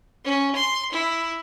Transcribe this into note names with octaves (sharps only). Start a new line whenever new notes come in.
C#4
C6
E4